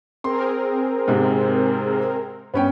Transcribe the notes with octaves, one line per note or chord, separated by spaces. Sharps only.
C4 G#4 A#4 C6
G#2 C3
G2 B3 C#4 G5